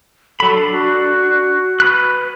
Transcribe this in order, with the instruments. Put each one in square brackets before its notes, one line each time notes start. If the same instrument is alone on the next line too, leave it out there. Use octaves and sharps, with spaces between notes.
[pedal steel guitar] F#3 B5 [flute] A4
[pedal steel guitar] D4
[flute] F#4
[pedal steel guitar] B4 B5 F#6